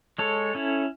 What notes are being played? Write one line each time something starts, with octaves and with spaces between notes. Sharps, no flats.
G#3 A4 C#5
C#4 E4